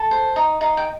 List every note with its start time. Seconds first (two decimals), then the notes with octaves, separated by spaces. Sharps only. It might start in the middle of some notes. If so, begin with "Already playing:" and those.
Already playing: A4
0.11 C5
0.36 D#4
0.61 D#4 F5
0.77 G5